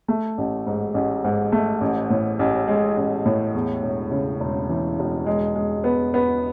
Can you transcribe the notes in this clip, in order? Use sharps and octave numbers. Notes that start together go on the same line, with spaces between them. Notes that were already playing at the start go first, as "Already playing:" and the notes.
A3
A1
G#2
A1
G#2
A3
A1
A2
A1
G#3
A1
A2
E2
E1
C#3
E1
E3
E1
G#3
G#3
B3
B3